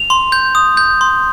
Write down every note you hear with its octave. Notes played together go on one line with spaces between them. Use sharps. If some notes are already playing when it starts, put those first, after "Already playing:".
Already playing: F7
C6
G6
D#6
G6
C6